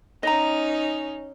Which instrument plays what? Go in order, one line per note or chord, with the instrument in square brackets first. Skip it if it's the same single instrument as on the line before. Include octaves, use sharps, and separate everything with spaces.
[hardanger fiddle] C#4 D#4 [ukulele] D#5 A#5